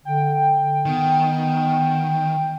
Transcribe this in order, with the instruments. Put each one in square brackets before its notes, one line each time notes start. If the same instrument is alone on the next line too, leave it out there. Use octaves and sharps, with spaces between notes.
[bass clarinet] D3 [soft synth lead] G5
[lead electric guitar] D#3 [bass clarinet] B3